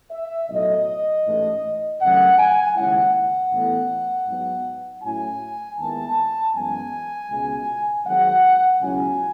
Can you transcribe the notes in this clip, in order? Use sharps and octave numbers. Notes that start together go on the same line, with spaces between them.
E5
B1 A2 F#3 D#5
A1 G#2 E3 A3
G#1 F#2 C#3 F#3 A3 F#5
G#5
D#2 C#3 G#3 C#4 E4 F#5
F#5
A1 A2 E3 B3
G#2 F#3 B3
A2 F#3 C#4 E4 G#5
D#2 D#3 G#3 B3 E4 A5
F#2 E3 G#3 B3 G#5
C#2 B2 G#3
G#1 G#2 F#3 F#5
C#2 B2 F#3 C#4 E4 G#5